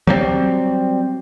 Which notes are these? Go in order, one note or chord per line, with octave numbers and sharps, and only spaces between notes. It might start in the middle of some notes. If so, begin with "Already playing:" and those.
F#3 G3 A#3 C4